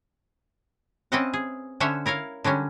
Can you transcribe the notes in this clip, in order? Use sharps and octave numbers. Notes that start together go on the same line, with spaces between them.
C4 C#4 B4 D#5 E5 F#5
G#4
D3 C#4 C5 C#5 E5 F#5
E4 A#4 C#5 F5
D3 F#3 G3 C#4